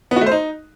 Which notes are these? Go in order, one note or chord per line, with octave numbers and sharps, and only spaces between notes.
B3
F#4
A3
C5
D#4